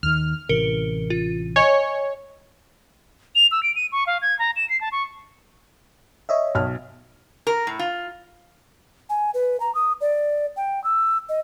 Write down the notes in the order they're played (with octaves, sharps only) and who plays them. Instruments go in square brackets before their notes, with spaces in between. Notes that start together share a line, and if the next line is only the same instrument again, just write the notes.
[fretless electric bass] D#2 D#3 [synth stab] F6
[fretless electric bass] A1 C3 E3 [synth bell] A#4 C#7 G7
[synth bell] F4
[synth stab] C#5 [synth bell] D#5 G#5
[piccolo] F7
E6
D7
D#7
C#6
F5
G#6
A#5
E7
C7
A5
C#6
[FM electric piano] C#5 D#5 E5
[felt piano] B1 F6
[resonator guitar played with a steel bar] A#4
A2
F4
[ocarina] G#5
B4
A#5
D#6
D5
G5
E6
D#5